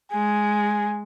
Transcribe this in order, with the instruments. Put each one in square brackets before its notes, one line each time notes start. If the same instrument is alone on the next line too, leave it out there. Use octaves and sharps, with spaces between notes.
[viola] G#3 [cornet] G#5